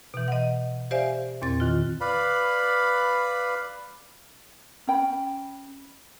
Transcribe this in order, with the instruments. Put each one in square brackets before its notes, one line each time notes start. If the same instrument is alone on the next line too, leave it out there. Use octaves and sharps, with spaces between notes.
[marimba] B2 E3
D#5 F#5
G4 C5 D5 E5 F5 G#5
E2 A#2 C4 A6
D#3 F4
[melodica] B4 D5 F5 B5
[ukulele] C#4 G5 B5